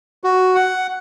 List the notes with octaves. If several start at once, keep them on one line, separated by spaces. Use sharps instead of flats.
F#4
F#5